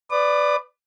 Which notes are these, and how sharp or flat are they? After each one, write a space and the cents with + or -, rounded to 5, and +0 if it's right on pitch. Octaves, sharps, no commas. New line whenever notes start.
B4 +15 D5 +0 D#6 -45